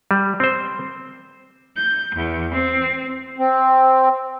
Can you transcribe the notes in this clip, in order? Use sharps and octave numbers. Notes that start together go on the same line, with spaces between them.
G3
C4 C5
G6
E2
C4
C4